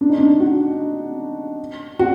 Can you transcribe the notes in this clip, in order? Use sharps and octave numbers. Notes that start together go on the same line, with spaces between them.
D4
D#4
D4
F#4
F#4